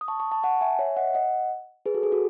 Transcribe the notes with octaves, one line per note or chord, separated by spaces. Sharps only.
D#6
A5 C#6
A5 C#6
A5 C#6
F#5 A5
E5 G#5
C#5 E5
D#5 F#5
D#5 F#5
G#4 B4
F#4 A4
G#4
F#4 A4